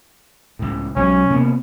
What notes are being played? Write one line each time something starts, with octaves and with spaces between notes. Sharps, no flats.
C#2 A2
B1 F#3 G#3 C#4
C3 A#3 B3